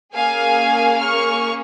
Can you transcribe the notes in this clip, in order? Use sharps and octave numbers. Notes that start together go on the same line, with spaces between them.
A#3 C#4 G#4 F5 G#5
C#6 F6